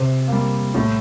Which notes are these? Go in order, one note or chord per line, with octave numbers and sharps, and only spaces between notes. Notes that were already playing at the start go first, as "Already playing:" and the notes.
Already playing: C3 C5
G3 A#3
A2